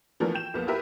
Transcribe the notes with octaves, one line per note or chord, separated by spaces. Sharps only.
E3 F3 A3 B3 D4 A#4
G5 G6 E7
B1 F2 A#3 B3
E4 F4 G4 A#4 B4 E5